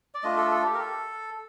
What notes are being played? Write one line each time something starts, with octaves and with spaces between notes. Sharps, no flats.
D5
A3 D4 F4 D#5
A4
A4
G4
A#4
A4